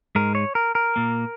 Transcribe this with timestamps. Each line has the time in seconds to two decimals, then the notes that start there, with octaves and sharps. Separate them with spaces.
0.15 G#2 G#3 A#4
0.35 C#5
0.55 A#4
0.75 A#4
0.96 A#2 A#3